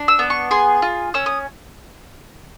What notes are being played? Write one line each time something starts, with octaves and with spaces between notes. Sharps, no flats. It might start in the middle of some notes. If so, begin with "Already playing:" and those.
Already playing: D4
E6
B3
C#6
G#4 C6
F4
C#4 E6
D#6